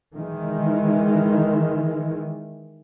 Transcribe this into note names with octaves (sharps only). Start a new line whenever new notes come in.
D#3 E3 G#3